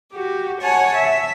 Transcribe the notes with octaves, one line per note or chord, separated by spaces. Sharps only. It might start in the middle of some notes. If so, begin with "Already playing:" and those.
F#4 G4
C#5 F#5 G#5 A5
E5